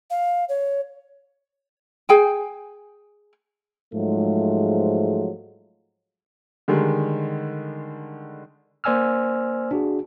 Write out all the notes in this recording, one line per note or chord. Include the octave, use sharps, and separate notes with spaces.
F5
C#5
G#4 G5 G#5
G#2 F3 F#3 G#3 A3
D3 D#3 G3 G#3
A#3 C5 D5 G#5 E6 F6
D4 F#4 G#4